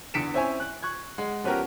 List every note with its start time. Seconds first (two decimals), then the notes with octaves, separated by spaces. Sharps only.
0.14 E2 D3 B6 C#7 D7 E7
0.34 C4 C#4 E4 C5 C#5 G#5
0.60 F#6
0.83 C#6 F#6 G#6
1.18 G#3 F#5
1.44 F3 B3 C#4 F#4 G4 A#4